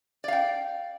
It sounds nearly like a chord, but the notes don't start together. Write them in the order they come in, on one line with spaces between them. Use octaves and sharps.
D5 F5 G5